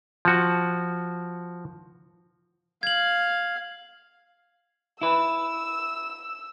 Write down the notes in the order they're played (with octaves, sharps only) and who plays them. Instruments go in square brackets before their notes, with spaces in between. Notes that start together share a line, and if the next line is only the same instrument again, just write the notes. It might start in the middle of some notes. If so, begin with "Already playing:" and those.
[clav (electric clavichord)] F3 F#4
[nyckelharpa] F5 [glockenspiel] G#6 F#7
[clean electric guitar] E4 B4 [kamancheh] E6